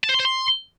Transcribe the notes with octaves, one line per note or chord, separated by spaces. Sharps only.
A5
C5
C6
C5
C6